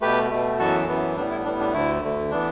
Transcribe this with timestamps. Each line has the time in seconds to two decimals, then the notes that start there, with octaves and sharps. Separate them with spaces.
0.01 B2 A3 G4 B4
0.30 B2 A3
0.59 F#2 E3 B3 F#4 A4
0.87 F#2 E3 B3
1.16 A2 G3 B3 D4
1.31 E4
1.45 A2 G3 B3 D4
1.59 D4
1.73 D2 D3 A3 E4
2.03 D2 D3 A3
2.31 E3 B3 D4